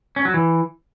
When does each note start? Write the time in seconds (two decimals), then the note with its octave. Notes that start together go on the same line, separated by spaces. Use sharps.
0.16 C#4
0.25 F#3
0.34 E3